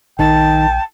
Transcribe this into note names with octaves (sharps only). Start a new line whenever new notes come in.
A#1 D#3 D#4 G5 A5